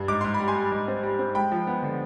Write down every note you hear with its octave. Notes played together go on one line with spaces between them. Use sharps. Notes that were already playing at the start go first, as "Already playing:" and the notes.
Already playing: G2
G#2 D6
G#2 C6
B5
G3
G#5 C6
G3
G#2
C4
G3
C4
G#3 G5 B5
F3
B3
D3